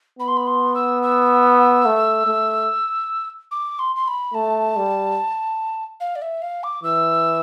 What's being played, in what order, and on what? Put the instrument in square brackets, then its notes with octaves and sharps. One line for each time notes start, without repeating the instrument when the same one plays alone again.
[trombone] B3 [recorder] B5
[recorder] C6
B5
C6
E6
E6
[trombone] A3
A3
[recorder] D6
C6
C6
B5
[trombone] A3 [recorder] A5
[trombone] G3
[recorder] F5
D5
E5
F5
D6
[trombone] E3 [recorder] E6